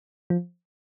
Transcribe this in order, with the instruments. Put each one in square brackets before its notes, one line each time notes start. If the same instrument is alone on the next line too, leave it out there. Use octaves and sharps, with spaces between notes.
[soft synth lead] F3